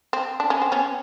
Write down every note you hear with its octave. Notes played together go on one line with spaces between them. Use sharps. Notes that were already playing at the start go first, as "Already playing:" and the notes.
C4
D4
C#4
C4
B3 C#4